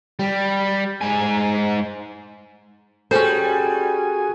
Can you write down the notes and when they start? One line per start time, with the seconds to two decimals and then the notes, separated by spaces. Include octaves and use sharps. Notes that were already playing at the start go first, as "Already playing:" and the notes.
0.19 G3
1.02 G#2 G#5
3.11 G3 C#4 F#4 G#4 A4 C5 G#5